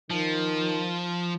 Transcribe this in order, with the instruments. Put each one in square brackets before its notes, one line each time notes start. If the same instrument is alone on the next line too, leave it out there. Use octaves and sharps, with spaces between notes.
[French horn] D#3 [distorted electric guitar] F3